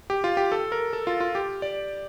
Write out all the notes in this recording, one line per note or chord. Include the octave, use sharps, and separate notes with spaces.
G4
F4
G4
A4
A#4
A4
F4
F4
G4
D5